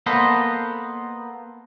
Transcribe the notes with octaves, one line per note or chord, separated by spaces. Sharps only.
A#3 B3 A4 B4 C5 D#5